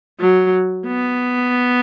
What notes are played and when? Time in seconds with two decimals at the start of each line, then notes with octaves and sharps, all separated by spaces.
0.20 F#3
0.86 B3